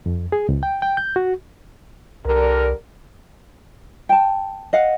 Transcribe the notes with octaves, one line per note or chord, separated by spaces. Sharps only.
F2
G#4
C#2
G5
G5
G6
F#4
C2 D3 G3 A#4
G5 A5
D#5 F5 F#5